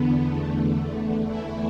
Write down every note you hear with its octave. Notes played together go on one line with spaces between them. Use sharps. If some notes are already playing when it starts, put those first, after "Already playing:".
Already playing: E2 D3 B3
E2 D3 A3
E2 E3 A3 E4